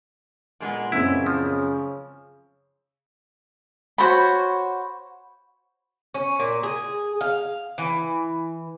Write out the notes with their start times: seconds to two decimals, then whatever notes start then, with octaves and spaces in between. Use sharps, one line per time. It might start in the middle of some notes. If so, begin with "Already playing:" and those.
0.60 A#2 G#3 B3
0.92 F#2 C#3 C4 E4 E6
1.26 F3
3.98 F#4 C5 C#5 B5
6.14 C#4
6.39 A#2
6.63 G#4
7.21 F5
7.78 E3